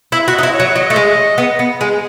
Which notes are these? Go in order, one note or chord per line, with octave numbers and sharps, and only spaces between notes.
E4 E5
F#4
D#5
D#4
E4
C#5
F#3
C#5
F#3 D#5
A3
G#3
B3
B3
G#3